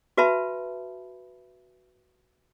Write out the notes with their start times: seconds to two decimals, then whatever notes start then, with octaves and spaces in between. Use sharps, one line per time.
0.17 F#4 B4 E5 A5 B5